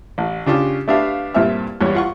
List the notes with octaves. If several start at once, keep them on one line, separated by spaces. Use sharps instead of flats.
A1
C#3 D4 F4 G4
A3 B3 D4 G4 E5 F5
G2 A#2 C4 E4 E5 F6
E2 G2 G3 C#5
F4 F#5 C#6